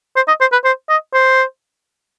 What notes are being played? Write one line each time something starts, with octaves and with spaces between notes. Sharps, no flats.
C5
D#5
C5
B4
C5
D#5
C5